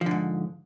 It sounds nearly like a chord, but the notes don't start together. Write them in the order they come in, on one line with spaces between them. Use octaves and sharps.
F3 D3 G#2